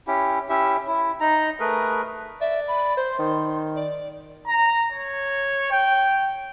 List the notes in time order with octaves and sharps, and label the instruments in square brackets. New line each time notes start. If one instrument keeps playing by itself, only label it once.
[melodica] C#4 E4 G4
C#4 E4 G4 E5
E4
D#4 A#5
A3 G#4 A#4 B4
[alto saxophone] D5 [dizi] E5
[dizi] B5
[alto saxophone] C5 [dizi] C6
[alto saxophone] D#3
[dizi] D5
[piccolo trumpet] A#5
C#5
G5